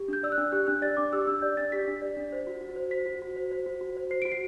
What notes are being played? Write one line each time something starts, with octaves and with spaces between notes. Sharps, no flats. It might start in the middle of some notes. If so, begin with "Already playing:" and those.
Already playing: G4
D4 G6
D5 E6
F#6
D4
G4 F#6
D4 F#6
D5 A6
D4 D6
G4 E6
D4 E6
D5 G6
D4 A6
G4 B6
D4
D5
D4
C5
F#4
F#4
C5
C5 B6
F#4
F#4
C5
C5
F#4
F#4
C5
C5 C7
F#4 D7
C7